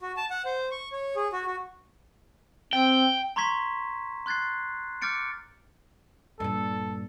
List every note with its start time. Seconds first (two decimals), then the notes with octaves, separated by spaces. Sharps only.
0.01 F#4
0.17 A5
0.31 F#5
0.45 C5
0.71 C#6
0.92 C#5
1.16 G#4
1.33 F#4
1.46 F#4
2.73 C4 G5
3.36 A#5 C6 C#6 G#6 B6 E7
4.26 C6 F#6 G#6 A6 C7
5.02 D6 F6 G6 A6 C#7 D7
6.40 G2 A#2 A4